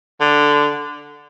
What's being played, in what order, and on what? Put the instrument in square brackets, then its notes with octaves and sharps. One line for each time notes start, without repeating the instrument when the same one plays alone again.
[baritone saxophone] D3